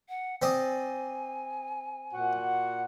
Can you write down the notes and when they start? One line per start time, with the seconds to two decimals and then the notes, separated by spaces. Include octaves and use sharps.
0.09 F#5
0.42 C4 D5 D#5 G#5
2.14 A#2 F#4 F#5